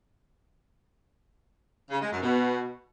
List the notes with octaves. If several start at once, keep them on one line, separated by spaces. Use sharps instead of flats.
C#3
G#3
F#2
B2